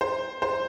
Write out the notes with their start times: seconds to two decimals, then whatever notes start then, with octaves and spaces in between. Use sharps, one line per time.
0.01 C5
0.42 C5